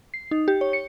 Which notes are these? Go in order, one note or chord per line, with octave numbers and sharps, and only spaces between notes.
C7
D#4
G4
C#5
C#7